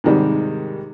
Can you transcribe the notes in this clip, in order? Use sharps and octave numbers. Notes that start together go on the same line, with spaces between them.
G#2 C3 D#3 G3